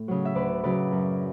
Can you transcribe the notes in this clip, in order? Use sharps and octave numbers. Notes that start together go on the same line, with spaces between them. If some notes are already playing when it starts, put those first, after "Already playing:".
Already playing: A2
C#3 F#3
E5
D2 B4 D5
C#3 F#3 B4 D5
F#2